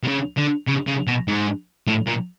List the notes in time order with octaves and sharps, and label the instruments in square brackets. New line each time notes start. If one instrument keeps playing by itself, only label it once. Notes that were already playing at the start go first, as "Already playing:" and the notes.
[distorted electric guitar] C3
C#3
D3
C#3
C#3
B2
G#2
A2
A#2